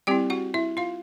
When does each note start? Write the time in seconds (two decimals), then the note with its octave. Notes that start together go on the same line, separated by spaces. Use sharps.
0.07 G3 C4 E4 G4 G5
0.30 F#4 F#5
0.54 E4 E5
0.77 F4 F5